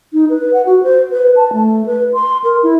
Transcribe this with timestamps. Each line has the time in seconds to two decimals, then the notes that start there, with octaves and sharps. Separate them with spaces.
0.13 D#4
0.30 B4
0.53 F#5
0.66 F#4
0.83 C5
1.11 B4
1.36 A5
1.53 A3
1.86 B4
2.14 C6
2.44 A#4
2.63 E4